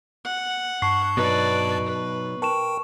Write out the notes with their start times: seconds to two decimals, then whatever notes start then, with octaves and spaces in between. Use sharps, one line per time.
0.25 F#5
0.82 G2 A5 C#6 C7
1.17 B2 F#3 D#4 B4 D5
1.85 B4
2.42 A#4 G5 A5 C#6 E7